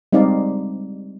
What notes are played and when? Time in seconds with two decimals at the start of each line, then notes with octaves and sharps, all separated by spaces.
0.12 G3 G#3 C4 D#4 D5 F5